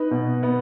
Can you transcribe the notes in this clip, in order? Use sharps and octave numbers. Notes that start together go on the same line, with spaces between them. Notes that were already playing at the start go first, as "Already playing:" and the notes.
Already playing: D#4 B4
B2
B3